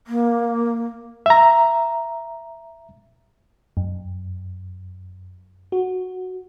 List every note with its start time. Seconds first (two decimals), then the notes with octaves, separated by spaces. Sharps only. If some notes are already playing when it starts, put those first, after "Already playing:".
0.07 A#3
1.26 E5 A#5
3.77 F#2
5.72 F#4